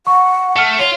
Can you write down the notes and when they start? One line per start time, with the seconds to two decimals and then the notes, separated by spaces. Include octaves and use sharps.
0.07 F#5 C#6
0.56 A3 F#5 F6
0.79 F4 C#5